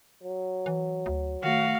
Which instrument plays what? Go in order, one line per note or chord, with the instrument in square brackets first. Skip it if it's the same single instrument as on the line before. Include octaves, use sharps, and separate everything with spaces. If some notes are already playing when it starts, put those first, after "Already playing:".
[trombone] F#3
[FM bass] E3
D2
[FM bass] D#3 [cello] A3 F#4 [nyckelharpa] F5